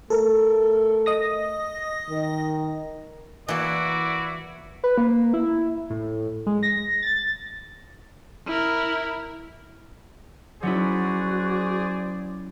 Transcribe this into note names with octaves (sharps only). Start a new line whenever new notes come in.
A3 A4 A#4
D#5 D#6 A#6
D#3
E3 A#3 E4 F#4 D5
B4
A#3
E4
A2
G#3
A#6
A6
E4 A#4
F#3 C#4 E4 F#4 G#4 C5 D5